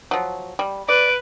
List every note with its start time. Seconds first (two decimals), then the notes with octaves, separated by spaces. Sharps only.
0.11 F3 F#3
0.59 G3
0.89 B4 D5 D7